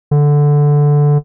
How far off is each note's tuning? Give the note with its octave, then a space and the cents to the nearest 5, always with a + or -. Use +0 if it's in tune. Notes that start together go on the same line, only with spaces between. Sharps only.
D3 -5